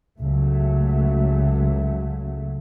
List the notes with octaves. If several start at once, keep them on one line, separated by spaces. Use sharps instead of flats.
C#2 C#3 F#3 A3